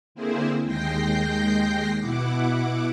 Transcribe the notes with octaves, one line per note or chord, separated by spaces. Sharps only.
D3 A#3 C4 E4 G#4 C5
D#2 G#3 G5 G6 A#6 C7
B2 E4 F#5 D6